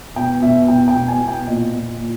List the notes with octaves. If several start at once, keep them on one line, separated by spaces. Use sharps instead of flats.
B2 G5
B2 E5
B2 G5
G5
B2
G#5
B2
G5
A#2 D#5
A#2
A#2